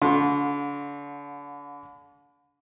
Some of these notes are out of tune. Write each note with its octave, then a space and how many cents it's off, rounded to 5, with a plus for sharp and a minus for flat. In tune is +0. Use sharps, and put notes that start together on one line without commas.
D3 -40 F#4 -40 C6 +25